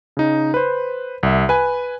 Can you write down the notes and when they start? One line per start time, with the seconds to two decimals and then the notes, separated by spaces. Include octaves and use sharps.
0.17 C#3 D#4
0.54 B4 C5
1.23 C2 E5
1.49 B4 G#5